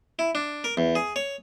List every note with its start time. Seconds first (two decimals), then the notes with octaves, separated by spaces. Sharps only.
0.19 E4
0.35 D4
0.64 A#4
0.77 E2
0.95 G#4
1.16 C#5